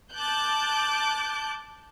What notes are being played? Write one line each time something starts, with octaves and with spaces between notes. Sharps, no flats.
A5 D6 F#6 G6